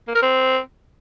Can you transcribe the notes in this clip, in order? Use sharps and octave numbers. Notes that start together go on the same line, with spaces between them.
A#3
A#4
C4